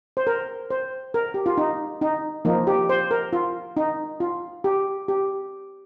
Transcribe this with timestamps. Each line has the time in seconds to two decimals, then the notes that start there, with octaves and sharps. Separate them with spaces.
0.17 C5
0.27 A#4
0.71 C5
1.14 A#4
1.34 G4
1.46 F4
1.58 D#4
2.02 D#4
2.45 F3 A#3 D#4
2.67 G4
2.89 C5
3.11 A#4
3.33 F4
3.77 D#4
4.20 F4
4.64 G4
5.08 G4